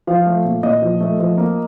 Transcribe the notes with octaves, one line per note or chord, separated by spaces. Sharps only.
F3 F5
A3
A#2
A#2 D#5
F3
A3
F3
A#3